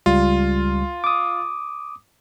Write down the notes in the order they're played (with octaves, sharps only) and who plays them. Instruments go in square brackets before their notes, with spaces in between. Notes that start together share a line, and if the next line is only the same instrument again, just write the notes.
[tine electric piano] C#2 G3 [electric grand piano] F4
[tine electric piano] D6 D#6